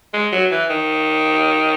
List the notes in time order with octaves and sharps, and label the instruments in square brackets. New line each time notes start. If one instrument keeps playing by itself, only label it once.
[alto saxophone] G#3
F#3
E3
D#3